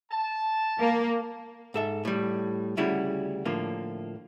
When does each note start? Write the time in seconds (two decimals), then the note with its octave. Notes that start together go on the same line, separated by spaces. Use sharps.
0.10 A5
0.79 A#3
1.74 G#2 A4 E5
2.05 A2 G3
2.77 D2 C#3 G3 E4 F#4
3.45 A2 D3 F3 A#3